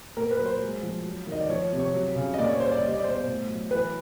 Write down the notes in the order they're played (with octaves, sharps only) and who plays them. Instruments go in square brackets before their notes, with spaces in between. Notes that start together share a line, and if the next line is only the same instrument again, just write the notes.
[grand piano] A#2 A#4
B4
F#3
C5
G#3
F3
F#3
D#3 D#5
D5
F3 C#5
C3
C#5
F#3
C#3
D#5
A#2 D5
C#5
G3 C5
D5
G3 D#5
D5
B2 C5
C5
A2
F#3
E3 B4